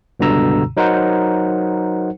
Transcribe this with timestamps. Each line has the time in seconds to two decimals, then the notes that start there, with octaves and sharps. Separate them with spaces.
0.20 C#2 G2 B2 D3 A#5 E6
0.77 F#3 D#4 A#4 C5 F#5